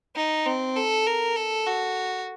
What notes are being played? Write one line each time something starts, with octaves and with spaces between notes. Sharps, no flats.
D#4
C4
A4
A#4
A4
F#4